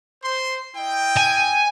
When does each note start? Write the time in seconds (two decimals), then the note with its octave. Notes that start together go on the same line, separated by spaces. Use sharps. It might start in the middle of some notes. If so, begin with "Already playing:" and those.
0.23 C5 C6
0.76 E4 D#5 G5
1.17 G#5